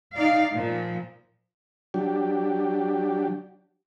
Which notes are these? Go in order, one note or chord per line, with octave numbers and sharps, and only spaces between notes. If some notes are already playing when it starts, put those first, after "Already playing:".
D#4 D5 F5
A#2 F3
F#3 D4 G4